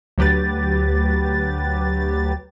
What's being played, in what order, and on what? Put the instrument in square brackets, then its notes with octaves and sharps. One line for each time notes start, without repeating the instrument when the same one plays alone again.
[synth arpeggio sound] D2 F#3 G4 B4 A6